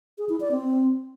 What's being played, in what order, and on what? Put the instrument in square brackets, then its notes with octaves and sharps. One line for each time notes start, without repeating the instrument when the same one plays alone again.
[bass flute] G#4
E4
D5
C4